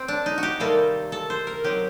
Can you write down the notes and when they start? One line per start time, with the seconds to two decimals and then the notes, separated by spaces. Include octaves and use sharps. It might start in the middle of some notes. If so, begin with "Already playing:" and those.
Already playing: C4
0.08 D4
0.26 D#4
0.38 F#4
0.43 G4
0.60 C3 D#3 G3 A#3 A4
1.12 A4
1.30 C5
1.47 A#4
1.64 D#3 F#3 C4 G4